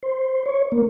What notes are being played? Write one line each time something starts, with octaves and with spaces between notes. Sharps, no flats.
C5
C#5
A#3